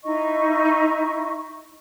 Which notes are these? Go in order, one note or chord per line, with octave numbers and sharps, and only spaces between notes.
D#4 E4 D#5 C#6